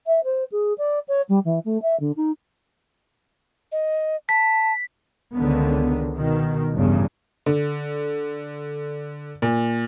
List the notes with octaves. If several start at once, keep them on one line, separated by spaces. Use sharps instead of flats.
E5
C5
G#4
D5
C#5
G3
E3
A3
E5
D3
D#4
D#5
A5 B6
C#2 D3 D#3 B3
B2 D#3
A1 E2 G2 C#3
D3
A#2